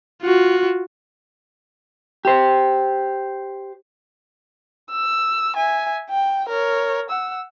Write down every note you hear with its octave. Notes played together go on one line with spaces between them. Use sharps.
F4 F#4
G4 C5
E6
E5 G#5
G5
A#4 C#5
F#5 E6